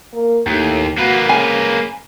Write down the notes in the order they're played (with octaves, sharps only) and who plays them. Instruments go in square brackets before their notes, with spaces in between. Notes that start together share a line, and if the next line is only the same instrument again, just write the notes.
[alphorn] A#3
[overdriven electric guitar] D#2 [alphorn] A2
[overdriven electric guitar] A#3 B4 [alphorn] F#4
[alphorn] C#3 [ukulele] G#5